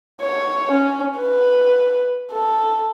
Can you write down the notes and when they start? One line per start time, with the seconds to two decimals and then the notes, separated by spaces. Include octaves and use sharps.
0.21 C#5
0.71 C#4
1.19 B4
2.32 A4